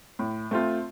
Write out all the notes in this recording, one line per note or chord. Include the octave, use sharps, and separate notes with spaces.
A2
A3 C4 F4